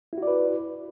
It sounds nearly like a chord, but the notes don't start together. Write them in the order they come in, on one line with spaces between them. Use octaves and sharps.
E4 F#4 D5 B4